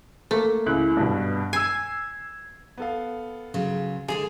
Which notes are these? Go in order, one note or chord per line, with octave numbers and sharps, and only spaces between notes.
A3 A#3
C#2 E4 F#6
G2 B2
G#5 E6 G#6 C7
B3 A4 F5
C#3 F#3 F4
D3 G#3 D4 G#4 F7